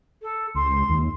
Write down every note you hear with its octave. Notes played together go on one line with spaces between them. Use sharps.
A4
C#2 C6
D#2